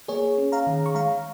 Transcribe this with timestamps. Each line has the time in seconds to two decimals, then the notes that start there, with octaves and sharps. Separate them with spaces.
0.08 A#3 G#4 C#5
0.38 C#4
0.52 F5 A#5
0.67 D#3
0.86 C#6
0.95 G#3 F5 A#5